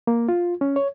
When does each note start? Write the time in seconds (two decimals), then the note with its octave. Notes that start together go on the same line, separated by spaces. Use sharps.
0.07 A#3
0.29 F4
0.61 C#4
0.76 C#5